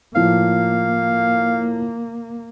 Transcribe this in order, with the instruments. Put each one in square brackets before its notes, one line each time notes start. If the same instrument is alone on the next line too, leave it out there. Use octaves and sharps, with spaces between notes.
[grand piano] A2 F3 [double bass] A#3 [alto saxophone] F5